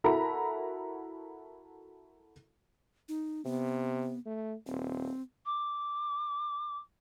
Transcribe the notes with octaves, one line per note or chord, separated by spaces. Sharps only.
E4 F#4 A4 A#4 A#5 B5
D#4
C3 B3
A3
D#1 C4
D6